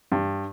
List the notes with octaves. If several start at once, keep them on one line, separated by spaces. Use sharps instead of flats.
G2